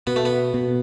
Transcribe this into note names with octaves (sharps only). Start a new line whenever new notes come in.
B2 B3
A3
B3
B2